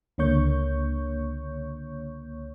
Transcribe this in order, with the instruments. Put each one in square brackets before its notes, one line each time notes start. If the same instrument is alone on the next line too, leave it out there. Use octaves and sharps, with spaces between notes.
[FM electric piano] C#2 D3 A#3 C#5 C#6 G6